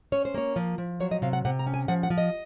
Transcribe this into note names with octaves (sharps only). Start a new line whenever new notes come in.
C#4 C#5
C5
A#3 C#5
F3
F3
F#3 C#5
D#5
C3 F5
F#5
C3 F#5
A#5
C#4
G#5
F3 F#5
F#5
F3
D#5